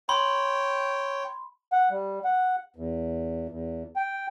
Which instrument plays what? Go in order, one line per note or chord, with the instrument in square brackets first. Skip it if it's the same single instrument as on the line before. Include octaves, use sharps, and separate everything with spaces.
[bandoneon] C#5 G5 [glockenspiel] B5 C6
[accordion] F#5
G3
F#5
E2
E2
G5